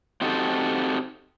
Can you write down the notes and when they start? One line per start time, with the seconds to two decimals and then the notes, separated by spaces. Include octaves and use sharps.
0.21 C4 D#4 F#4 G4 A4